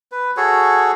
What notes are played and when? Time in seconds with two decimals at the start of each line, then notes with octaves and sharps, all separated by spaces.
0.12 B4
0.37 F#4 G#4 A4 C#5